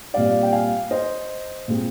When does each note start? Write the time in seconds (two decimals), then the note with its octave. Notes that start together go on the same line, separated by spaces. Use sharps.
0.14 A#2 G3 C4 D5 F5
0.43 G5
0.53 F5 G#5
0.91 C5 D#5
1.68 A#2 G#3 C4